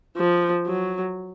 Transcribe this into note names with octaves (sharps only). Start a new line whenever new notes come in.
F3
F#3